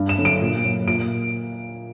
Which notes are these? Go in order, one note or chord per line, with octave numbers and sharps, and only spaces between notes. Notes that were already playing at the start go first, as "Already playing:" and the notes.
Already playing: G2
E7
D3 F#3
D7
A#2
F#3
A#2 D7